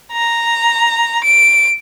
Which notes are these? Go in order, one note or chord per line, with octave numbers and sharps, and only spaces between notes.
A#5
D7